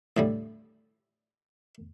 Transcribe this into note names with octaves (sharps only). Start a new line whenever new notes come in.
A2 D3 G3